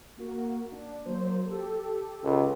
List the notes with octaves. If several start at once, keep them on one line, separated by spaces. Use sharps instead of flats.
A#3 F#4 A#4
D4
F#3 A#3 C5
G4 A4
C#2